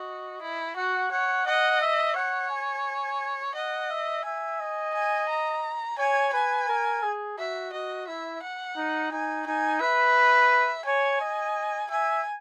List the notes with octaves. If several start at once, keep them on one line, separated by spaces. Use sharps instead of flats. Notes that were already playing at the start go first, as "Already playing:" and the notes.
Already playing: F#4 D#5
E4
F#4 F#5
C#5 F#5
D#5 F#5
E5
C#5 F#5
G#5
D#5 F#5
E5
E5 G#5
D#5
G#5
A#5
C#5 G#5
B4 G#5
A#4
G#4
F#4 E5
F#4 D#5
E4 E5
F#5
D#4
D#4 G#5
D#4 G#5
B4 E5
C#5 G#5
D#5
E5 G#5